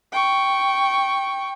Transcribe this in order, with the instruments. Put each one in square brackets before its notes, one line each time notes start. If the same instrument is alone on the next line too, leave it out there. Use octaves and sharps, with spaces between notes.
[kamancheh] G5 C#6